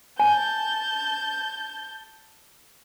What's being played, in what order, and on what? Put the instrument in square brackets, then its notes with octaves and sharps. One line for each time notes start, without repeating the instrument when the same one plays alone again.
[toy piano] G#5 [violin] A5 G6